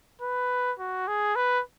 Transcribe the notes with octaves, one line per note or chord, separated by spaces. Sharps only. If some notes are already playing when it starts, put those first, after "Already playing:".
B4
F#4
G#4
B4